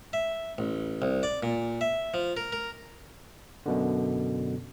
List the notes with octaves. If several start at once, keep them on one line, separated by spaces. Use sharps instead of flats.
E5
A1
C2
D5
A#2
E5
F3
A#4
A#4
F#2 B2 D3